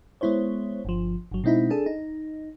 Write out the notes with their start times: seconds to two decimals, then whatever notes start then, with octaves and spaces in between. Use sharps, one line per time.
0.21 G#3 B3 E4 C5 C#5
0.85 G1 F3
1.32 G1 F#3
1.44 B2 G#3 C4 D#4 E4
1.70 D4 G#4 A4
1.86 D#4